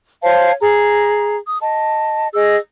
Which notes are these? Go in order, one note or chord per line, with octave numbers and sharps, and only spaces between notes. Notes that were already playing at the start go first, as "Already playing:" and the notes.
C5 C#5 F5 A5
G#4 A#5
D#6
D#5 A5
G#4 D#5 E6